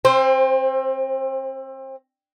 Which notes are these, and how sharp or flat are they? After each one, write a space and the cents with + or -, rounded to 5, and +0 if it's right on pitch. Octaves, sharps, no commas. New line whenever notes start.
C4 +30 C5 +0